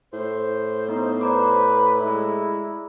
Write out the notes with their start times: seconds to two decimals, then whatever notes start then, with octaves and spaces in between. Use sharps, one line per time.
0.13 A2 C5
0.88 B3 D#4
1.21 B4 D5 A#5 D6
2.00 G#3 E4